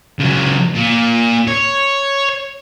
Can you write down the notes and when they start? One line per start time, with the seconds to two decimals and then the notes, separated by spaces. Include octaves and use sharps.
0.19 C#2 F#3
0.75 A#2
1.48 C#5